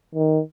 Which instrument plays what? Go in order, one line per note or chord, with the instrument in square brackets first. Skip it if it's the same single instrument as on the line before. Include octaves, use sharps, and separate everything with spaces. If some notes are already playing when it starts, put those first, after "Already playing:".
[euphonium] D#3